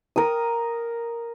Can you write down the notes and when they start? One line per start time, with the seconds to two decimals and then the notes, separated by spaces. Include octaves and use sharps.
0.16 A#4 D#6